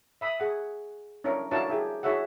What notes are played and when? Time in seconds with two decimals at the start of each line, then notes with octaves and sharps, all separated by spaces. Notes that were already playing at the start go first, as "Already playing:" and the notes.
0.21 E5 B5 D#6
0.40 G#4 F#5
1.24 C#4 D4 E4 A#4 C#5
1.51 D4 E4 F#4 A#4 C#5 A5
1.70 E4 G4 G#4
2.03 E4 F#4 G#4 C#5 E5 F#5